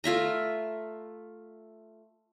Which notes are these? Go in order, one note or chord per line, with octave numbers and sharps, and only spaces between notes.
A3 F4 E5 A#5